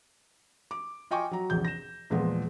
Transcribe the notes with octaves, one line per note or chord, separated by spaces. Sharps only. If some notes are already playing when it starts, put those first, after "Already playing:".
D6
F4 D#5 G5 G#5 C#6 D6
F#3 A#5
F1 A#1 E2 G6
A#6 E7
E2 A#2 F3 G#3 B3